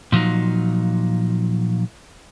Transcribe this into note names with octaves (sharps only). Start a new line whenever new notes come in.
A#2 F3 F#3 D#4